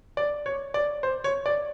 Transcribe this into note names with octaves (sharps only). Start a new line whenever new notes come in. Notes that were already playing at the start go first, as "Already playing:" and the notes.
D5
C#5
D5
C5
C#5
D5